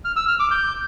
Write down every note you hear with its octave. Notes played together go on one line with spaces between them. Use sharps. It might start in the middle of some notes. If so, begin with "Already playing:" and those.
F6
E6
F6
D6
G6